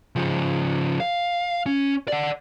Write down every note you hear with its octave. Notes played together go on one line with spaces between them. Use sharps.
C#3 F3
F5
C#4
D5 F#5